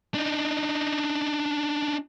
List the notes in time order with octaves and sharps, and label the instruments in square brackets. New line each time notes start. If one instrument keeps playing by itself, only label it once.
[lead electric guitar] D4 D#4